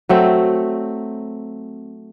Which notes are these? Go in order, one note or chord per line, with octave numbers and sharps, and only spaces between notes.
F#3 A3 C4